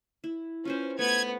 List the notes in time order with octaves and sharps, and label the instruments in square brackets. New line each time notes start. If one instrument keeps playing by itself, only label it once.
[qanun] E4
[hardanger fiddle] C#4 [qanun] F4 B4 C5
[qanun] A3 [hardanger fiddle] B3 [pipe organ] G#6